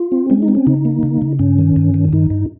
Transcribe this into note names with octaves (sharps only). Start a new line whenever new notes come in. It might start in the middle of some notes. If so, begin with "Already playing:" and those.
Already playing: F4
C4
G#3 C#4
D#4
C4
C#4
C#3 D#4
A#3
C#3
C#3
G2 C#4
D#3
G2
D#3
G2 D#4
G2